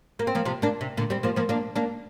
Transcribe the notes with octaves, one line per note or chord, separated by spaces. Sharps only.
A#3
C4
F3 A#3
C3 F3
A#3 D4
C3
A#2 D3
G3 C4
F3 A#3
F3 A#3
A#3 D4
A#3 D4